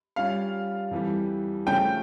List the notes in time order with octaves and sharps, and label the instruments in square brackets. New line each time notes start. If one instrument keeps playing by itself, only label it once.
[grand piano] G3 C#4 F4 C#5 [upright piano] F5
[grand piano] F2 E3 G3
[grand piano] C#3 F3 A3 C#4 [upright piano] G5